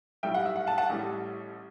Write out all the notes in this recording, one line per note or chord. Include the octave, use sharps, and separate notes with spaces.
B1 A2 G3 E5 G5
F#5
E5
F#5
F#5 A5
F#5 A5
A1 A2 G3